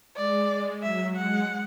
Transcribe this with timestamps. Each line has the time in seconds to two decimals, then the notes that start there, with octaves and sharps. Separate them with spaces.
0.16 G#3 D5
0.50 G#3
0.83 F#3 E5
1.16 G#3 F#5